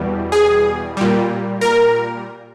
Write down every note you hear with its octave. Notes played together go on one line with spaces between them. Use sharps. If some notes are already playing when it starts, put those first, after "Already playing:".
Already playing: E2 B2 G3
G#4
A#2 G3
A#4